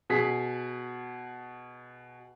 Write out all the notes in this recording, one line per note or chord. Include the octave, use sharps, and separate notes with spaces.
B2 G#4 B6